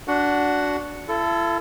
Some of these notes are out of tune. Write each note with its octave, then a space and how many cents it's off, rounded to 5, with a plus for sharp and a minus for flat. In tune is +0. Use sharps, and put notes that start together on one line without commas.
D4 -15 F#4 +5 F#5 +0
E4 +45 A4 +0